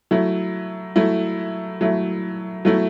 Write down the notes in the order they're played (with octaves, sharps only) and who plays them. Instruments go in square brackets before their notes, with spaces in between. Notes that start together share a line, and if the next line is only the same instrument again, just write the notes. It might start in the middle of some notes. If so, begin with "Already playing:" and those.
[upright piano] F#3 A3 E4
F#3 A3 E4
F#3 A3 E4
F#3 A3 E4